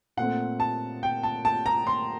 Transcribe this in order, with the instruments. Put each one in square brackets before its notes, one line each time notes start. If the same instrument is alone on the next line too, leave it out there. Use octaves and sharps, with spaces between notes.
[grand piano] A#2 A3 C4 F#5
A5
G5
A5
A5
A#5
C6